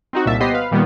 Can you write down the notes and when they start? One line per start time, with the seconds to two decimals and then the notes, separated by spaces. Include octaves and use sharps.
0.13 C4 D#4 F#4
0.26 C2 A#2 E5 A5
0.40 B3 G4 C5 D#5 B6 C7
0.54 B4 F5
0.72 A#2 D#3 G3 A#3 B3